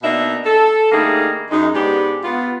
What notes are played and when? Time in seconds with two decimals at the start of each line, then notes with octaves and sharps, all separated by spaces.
0.03 B2 A#3 D4 D#4 E5
0.45 A4
0.92 D3 G3 A3 A#3 D#4 G#4
1.50 F#2 G#3 D#4
1.73 G#2 B3 D4 G4
2.23 B3 F4